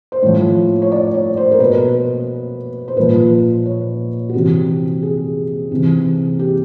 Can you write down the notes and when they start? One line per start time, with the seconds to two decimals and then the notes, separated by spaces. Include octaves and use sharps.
0.12 C5
0.23 A2 F3 C#5
0.82 C#5
0.92 D5
1.14 C#5
1.37 C5
1.51 A#4
1.59 B2 B4
2.88 C5
2.96 A#2 F3 B4
3.66 C#5
4.29 F#4
4.34 C3 E3 G4
5.02 G#4
5.71 C3 E3
6.39 G4